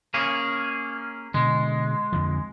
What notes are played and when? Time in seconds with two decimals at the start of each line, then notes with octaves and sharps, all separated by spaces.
0.14 A#3 C#4 G#4
1.34 B2 D3 G#3
2.12 F2 D3 F3